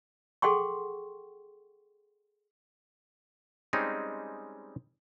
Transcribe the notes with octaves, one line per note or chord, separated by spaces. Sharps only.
G#4 A4 F#5 G5 C6 C#6
G3 G#3 C4 C#4 D#4